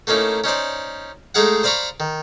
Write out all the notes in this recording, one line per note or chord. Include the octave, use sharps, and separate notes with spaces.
A3 A#3 C#4 D#4 E4
C#4 D#4 C5 D5
G#3 A3 D#4 G#4 F5 F#5
C5 D5 F5 A#5 B5 C#6
D#3